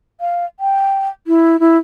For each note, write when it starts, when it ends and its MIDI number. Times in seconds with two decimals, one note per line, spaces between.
0.20 0.45 77
0.60 1.08 79
1.27 1.59 64
1.60 1.77 64